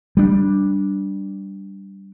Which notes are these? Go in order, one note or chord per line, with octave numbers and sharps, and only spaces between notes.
G3 D4